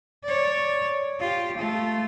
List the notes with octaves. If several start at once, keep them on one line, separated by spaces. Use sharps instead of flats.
C#5 D5
F4 G4
A3 F4